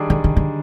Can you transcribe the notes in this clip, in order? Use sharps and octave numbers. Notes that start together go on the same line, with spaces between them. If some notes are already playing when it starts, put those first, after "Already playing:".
Already playing: D#3 G3 D4 G#4 D5
D3
D3
D3